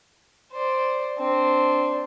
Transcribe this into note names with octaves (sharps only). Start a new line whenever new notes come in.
C5 D5
C4 D4